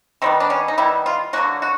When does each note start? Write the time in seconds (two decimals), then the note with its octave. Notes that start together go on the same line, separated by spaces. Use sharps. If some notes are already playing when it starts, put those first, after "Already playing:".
0.22 D#3 G3 B3 C4
0.40 D4
0.50 C#4
0.68 D#4
0.78 D#3 G3 B3 E4
1.06 F4
1.33 D3 F#3 A#3 F#4
1.62 F#4